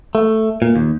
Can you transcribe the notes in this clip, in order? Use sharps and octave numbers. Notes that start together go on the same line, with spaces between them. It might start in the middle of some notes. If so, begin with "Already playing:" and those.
A3
A#2
D#2